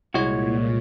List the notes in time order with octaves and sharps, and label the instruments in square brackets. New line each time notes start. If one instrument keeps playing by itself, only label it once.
[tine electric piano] C2 G#3 C#5 [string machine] A#2 [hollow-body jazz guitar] E4 F#4